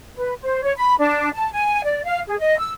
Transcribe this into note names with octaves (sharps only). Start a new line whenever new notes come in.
B4
C5
C#5
B5
D4
A5
G#5
D5
F5
G#4
D#5
E6